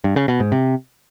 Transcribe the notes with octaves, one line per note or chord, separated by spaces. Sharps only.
G2
C#3
B2
G#2
C3